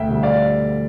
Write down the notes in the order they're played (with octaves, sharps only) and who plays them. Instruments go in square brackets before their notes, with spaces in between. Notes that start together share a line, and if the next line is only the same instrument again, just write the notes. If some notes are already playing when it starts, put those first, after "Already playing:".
Already playing: [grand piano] D2 E5 G5
D3 G3
D2 D5 F5